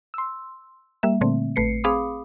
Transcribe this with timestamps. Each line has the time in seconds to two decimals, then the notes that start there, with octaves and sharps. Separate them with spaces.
0.14 C6 E6
1.03 G3 A#3 E5
1.21 A#2 D3 A3 C4
1.56 A1 A3 B4 C7 C#7
1.84 C4 G#4 F5 B5 D6 D#6